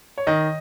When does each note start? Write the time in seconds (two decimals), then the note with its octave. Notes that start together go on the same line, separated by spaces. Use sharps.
0.18 C#5
0.27 D#3 D#5